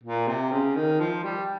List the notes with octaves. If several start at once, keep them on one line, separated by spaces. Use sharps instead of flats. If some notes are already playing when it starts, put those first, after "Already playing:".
A#2
C3
C#3
D#3
F3
G3